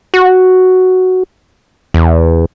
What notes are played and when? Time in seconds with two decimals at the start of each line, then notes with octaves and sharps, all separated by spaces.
0.14 F#4
1.94 E2